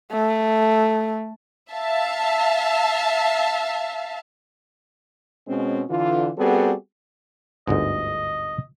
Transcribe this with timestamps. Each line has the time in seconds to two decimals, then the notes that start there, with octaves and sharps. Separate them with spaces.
0.12 A3
1.71 E5 F5 A5
5.48 B2 G#3 C4 C#4
5.90 D3 E3 F4
6.38 G3 B3 C4 F#4 G#4 A4
7.68 G1 D2 G#2 D#5